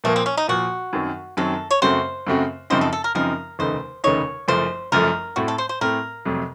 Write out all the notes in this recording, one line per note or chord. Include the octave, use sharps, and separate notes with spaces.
A#2 F3 A3 A#3
C4
C#4
D#4
A#2 F3 A#3 F#4
F#2 D#3 F#3 C4
F#2 D#3 F#3 C4 A4
C#5
F#2 C#3 A3 C4 F#4 C5
F#2 C#3 A3 C4 F#4
F#2 C#3 F3 C4 D#4 C5
A4
A4
A#4
F#2 C#3 F3 C4 D#4 A#4
F1 D#2 C#3 A3 D#4 C5
F1 D#2 C#3 A3 D#4 C#5
F#1 F#2 F3 A3 C5
F#1 F#2 F3 A3 A#4
A2 A3 C4 F#4
A4
C5
C5
A2 A3 C4 A#4
F2 C3 F#3 A3